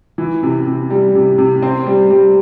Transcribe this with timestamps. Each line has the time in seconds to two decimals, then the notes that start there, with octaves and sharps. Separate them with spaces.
0.18 E3
0.43 C3
0.66 C3
0.90 G3
1.15 C3
1.38 C3
1.62 C4
1.86 G3
2.11 G3